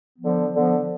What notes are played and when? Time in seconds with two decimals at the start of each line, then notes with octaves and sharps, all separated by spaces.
0.19 D3 F3 B3
0.52 D3 F3 B3